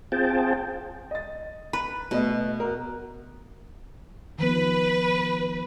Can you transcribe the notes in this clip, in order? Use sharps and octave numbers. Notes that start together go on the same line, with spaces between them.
C4 F4 G#4 G5 A5
D#5 A6
B4 B5
B2 A3 B4 D#5
F#4 A#4
D#3 F3 B3 B4